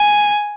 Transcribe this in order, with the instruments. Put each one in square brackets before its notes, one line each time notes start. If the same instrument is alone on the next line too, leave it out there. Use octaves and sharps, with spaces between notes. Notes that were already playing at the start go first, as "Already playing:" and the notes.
Already playing: [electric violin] G#5